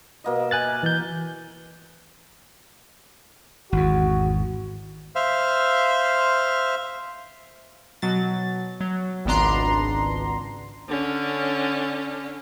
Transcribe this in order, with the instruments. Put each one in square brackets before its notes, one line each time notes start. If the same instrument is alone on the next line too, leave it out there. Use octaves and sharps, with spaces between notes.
[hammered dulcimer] B2 A#3 D#5
[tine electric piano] G#5 F#6 A6
[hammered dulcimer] E5
[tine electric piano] E3 G6
[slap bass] G#1 E2 [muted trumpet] F#4
[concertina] C5 E5 F5
[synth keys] B2 F#3 A6
F#3
G#1 C#2 B3 D4 A#5 C6
[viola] D3 C#4